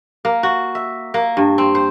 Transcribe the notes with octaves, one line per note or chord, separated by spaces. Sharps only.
A#3
F#4
E5
A#3
G2
C4
C5